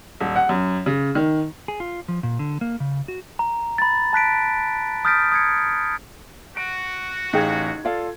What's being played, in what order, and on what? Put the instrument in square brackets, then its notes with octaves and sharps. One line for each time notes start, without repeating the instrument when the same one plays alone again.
[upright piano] D#1
F#5
F#2
C#3
D#3
[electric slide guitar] G#4
F4
F3
A#2
D3
A#3
C#3
F#4
[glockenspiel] A#5
B5 A6
A5 F#6 B6 D7
D#6 F6 G6 A6 B6 D7
D#6 G#6 C#7
[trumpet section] F#4 [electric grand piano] D7
[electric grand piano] A1 F5 G#6 [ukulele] D#4 G#4 G5
[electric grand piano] F4 A4 [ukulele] D5 F5